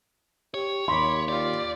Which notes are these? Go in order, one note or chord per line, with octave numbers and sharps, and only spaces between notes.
G4 C#5
D#2 B5 C6 D6
F4 G4 D5